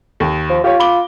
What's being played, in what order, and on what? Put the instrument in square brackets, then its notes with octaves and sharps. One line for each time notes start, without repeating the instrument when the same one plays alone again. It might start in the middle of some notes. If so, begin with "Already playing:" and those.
[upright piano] D#2
[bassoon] F3
[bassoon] F4 [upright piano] G4 C#5
[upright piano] B5 D6 G7